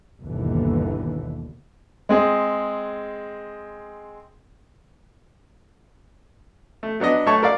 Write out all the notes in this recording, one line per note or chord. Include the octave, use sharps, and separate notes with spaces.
G1 D#2 B2 D3 E3
G#3 C4 G#4
A3
F#3 B3 D4 D#5
B1 A3 C#5 A5 C#6
A#4 D5 F5